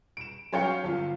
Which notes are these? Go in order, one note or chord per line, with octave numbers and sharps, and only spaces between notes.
D7 E7
F#3 C#4 C#5 F5 G5 C#7
G1 F4